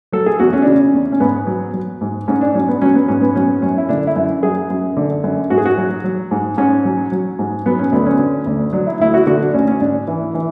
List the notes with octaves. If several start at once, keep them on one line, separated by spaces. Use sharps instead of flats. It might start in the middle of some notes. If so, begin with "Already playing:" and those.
F#3 A4
G#4
E2 F#4
C#4
D4
C#3 C#4
E2
C#4
G#2 B3
F#3
F#3
G#2
G#2 C#4
D4
F#3 C#4
B3
F#3 C#4
B3
G#2 C#4
B3
F#3 C#4
F#2 C#4
E4
D3 D4
E4
F#2
F#3 G#4
F#2
D3
F#2
G#2 F#4
G#4
F#4
F#3
F#3
G#2
G#2 C#4
F#3
F#3
G#2
F#3 B3
C#4
D2 B3
C#4
D3
D2
F#3 D4
E4
D2 E4
F#4
D3 F#4
D4
D2 C#4
C#4
G#2 D4
E3
E3